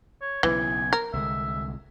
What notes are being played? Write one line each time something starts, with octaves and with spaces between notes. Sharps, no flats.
C#5
B1 C#3 E3 G#5
A#4
C2 D3 G#3 E5